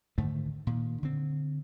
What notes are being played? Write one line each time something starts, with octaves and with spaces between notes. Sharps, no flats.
G#2 D3 D#3 A3
A#2 D#3
D3 C4